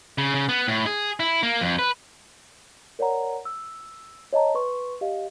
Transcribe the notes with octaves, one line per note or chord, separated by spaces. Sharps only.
C#3
C#3
B3
A2
G#4
E4
A#3
F2
B4
A#4 C#5 D5 F#5 A#5
E6
C#5 D#5 A5 A#5
B4 C6 C#6
G4 D#5 F5